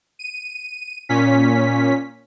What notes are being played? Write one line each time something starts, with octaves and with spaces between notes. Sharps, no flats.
D#7
A#2 C#4 B6